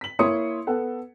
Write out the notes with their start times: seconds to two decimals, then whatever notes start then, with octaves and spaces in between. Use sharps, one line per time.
0.01 B6 F#7
0.19 A#3 E4 C#5 C6 D#6 C#7
0.67 B3 A4 F#5